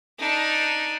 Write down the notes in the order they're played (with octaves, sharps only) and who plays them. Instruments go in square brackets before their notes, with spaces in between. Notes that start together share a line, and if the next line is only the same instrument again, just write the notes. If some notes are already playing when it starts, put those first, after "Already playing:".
[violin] D4 D#4